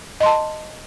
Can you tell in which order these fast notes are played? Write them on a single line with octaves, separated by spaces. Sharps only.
D#5 C6 A5